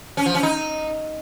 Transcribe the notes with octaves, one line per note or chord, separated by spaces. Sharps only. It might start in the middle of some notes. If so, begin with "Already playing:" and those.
C#4
F3
C#4
D#4